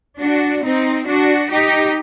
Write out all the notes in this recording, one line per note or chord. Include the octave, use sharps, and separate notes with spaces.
D4 F#4
C4 D#4
D4 F#4
D#4 G4